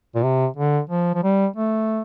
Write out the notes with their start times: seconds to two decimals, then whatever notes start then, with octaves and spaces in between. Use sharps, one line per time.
0.15 A#2
0.23 C3
0.57 D3
0.90 F3
1.15 F3
1.24 G3
1.56 A3